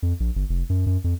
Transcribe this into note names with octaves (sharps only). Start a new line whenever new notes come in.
F2
A#1
G1
F1
F#2
F#2
F2